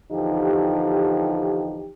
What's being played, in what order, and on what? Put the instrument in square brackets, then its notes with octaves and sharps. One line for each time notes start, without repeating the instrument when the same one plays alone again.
[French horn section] E2 D3 F3 D#4 G4